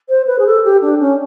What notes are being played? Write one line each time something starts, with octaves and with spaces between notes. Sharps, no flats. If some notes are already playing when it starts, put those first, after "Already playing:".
C5
B4
G#4
A4
G4
D4
C#4